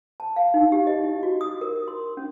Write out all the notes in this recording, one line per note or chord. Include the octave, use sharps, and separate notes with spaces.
A5
F5
D#4
G4
D#5
E4
F#4
D#6
A#4
C6
C#4